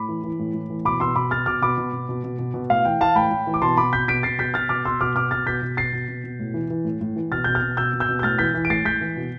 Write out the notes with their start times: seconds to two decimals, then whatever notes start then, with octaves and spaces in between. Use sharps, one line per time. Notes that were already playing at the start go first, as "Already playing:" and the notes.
Already playing: A2 B5 D6
0.09 E3
0.24 E3
0.39 A2
0.54 A2
0.70 E3
0.85 B2 B5 D6
1.00 B2 C6 E6
1.16 B2 B5 D6
1.31 B2 F6 A6
1.46 B2 D6 F6
1.62 B2 B5 D6
1.78 B2
1.93 B2
2.09 B2
2.24 B2
2.39 B2
2.54 B2
2.70 A2 F5
2.85 E3 G5
3.01 E3 F5 A5
3.16 A2 G5 B5
3.31 A2
3.47 E3
3.54 D6
3.62 B2 A5 C6
3.77 B2 B5 D6
3.93 B2 G6 B6
4.08 B2 B6 D7
4.23 B2 A6 C7
4.38 B2 G6 B6
4.54 B2 F6 A6
4.69 B2 D6 F6
4.85 B2 C6 E6
5.00 B2 D6 F6
5.16 B2 D6 F6
5.31 B2 F6 A6
5.46 B2 G6 B6
5.62 B2
5.77 B2 A6 C7
5.93 B2
6.08 B2
6.24 B2
6.39 A2
6.54 E3
6.70 E3
6.85 A2
7.01 A2
7.16 E3
7.31 B2 F6 A6
7.44 B2 G6
7.55 F6 A6
7.62 B2
7.77 B2 E6 G6
7.93 B2
8.00 E6 G6
8.09 B2
8.19 G6
8.23 A2 F6 A6
8.39 E3 G6 B6
8.54 E3
8.65 D7
8.70 A2 A6 C7
8.85 A2 G6 B6
9.01 E3
9.16 B2